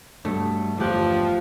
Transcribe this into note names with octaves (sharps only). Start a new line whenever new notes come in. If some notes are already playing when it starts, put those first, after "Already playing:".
G2 B2 A3
G1 E2 F3 A3 G4 F#6